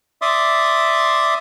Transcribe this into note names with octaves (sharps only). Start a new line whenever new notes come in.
D5 E5 C6 D6 D#6